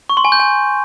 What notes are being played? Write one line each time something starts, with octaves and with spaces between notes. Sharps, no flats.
C#6
C6
G#5
G6
G#5